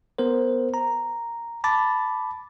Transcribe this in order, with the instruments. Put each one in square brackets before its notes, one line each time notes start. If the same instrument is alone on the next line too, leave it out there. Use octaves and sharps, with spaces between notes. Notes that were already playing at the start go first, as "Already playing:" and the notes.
[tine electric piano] B3 A#4 C5
A#5
A5 B5 D6 A6